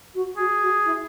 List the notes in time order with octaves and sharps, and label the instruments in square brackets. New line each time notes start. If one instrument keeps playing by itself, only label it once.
[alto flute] F#4
[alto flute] F#4 [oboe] G#4
[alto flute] F#4
E4